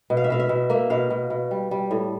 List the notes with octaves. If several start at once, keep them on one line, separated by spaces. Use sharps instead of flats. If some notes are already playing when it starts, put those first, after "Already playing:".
B2
F5
E5
B2 F5
E5
B2
A#3 E5
B2 F5
B2
B2
G3
G3
A2